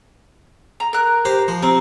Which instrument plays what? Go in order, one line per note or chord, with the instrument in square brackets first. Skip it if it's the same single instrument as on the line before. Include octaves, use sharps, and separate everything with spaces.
[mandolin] A#5
A#4 F#6
[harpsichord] G4 C5 A#5
F3 C5
[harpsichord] C3 C4 [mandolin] A#4